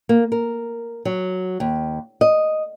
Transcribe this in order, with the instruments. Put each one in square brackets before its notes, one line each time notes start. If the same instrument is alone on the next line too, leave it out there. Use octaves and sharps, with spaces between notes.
[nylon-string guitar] A#3
A#4
F#3
D#2
D#5